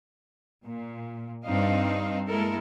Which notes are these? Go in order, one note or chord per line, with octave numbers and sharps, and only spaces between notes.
A#2
G2 C4 D4 D#4 F5
G#3 A#3 E4 A4 A#4